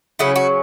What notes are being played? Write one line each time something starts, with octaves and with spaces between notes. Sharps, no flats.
C#3 F#3 C#4 E4 G#4
F#4